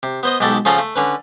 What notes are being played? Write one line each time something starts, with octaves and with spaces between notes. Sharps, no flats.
C3
B3 C5 D#5
B1 G#2 F#4 G4 A4 A5
C#3 F3 C#4 F4 A4 F#5
A3
D3 C#4 B4